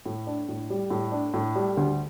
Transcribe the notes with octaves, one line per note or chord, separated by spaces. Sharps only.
A2
D4
A2
G3
A2
D4
A2
G3
D2